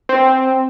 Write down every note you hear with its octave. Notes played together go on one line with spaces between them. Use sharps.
C4